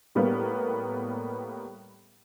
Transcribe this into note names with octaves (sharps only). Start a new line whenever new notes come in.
A2 G3 A#3 B3